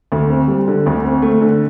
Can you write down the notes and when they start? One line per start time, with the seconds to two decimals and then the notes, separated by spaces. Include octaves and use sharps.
0.12 D2
0.30 C4
0.48 G3
0.68 D3
0.86 D2
1.04 C4
1.22 A3
1.42 D3